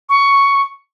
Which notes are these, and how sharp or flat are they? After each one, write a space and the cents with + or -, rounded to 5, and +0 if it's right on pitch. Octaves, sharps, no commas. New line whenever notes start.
C#6 +10